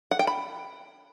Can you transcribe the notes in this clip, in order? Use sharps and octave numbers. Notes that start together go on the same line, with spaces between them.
F#5
G5
B5